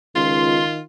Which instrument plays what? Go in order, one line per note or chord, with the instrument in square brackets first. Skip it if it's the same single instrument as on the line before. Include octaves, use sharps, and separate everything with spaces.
[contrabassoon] C#2 [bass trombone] D#3 [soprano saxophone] F4 [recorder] C6